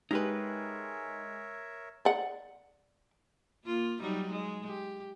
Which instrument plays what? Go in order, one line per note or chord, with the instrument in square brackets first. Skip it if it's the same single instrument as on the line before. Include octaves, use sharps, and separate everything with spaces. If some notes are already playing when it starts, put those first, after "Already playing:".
[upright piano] G#3 [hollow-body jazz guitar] D#4 G4 B4 [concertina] A#4 C#5 E5
[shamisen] D5 F#5
[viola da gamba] A#3 F4
F#3 G3 D#4
G#3
G4